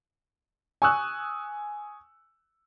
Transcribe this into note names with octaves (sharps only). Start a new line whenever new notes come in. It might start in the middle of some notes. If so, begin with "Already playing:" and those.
G#5 C#6 D#6 E6 F#6